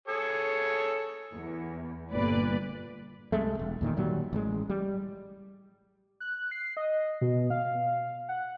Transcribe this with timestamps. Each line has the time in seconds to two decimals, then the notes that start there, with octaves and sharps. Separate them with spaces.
0.08 G#4 A4 C#5
1.32 E2
2.12 G1 A#2 B4 D5
3.32 C2 C3 G#3 A3
3.59 E1
3.81 E2 A#2 D#3
3.97 A#2 D#3 F#3 G3
4.33 A1 G#3
4.69 G3
6.20 F#6
6.51 C7
6.77 D#5
7.21 B2
7.50 F5
8.29 F#5